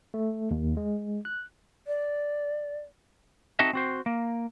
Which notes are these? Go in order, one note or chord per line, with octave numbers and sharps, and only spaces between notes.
A3
D#2
G#3
F#6
D5
C4 D#4 F#4 A4 D#5 E5
C4 F#4 C5
A#3